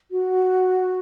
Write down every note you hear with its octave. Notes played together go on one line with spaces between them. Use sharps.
F#4